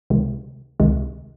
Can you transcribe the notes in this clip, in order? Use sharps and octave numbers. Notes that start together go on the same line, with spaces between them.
C#2 C3 D#3 G#3
C#2 C3 D#3 G#3